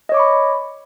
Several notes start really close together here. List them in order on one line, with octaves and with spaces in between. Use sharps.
D#5 C#5 D6 C#6 B5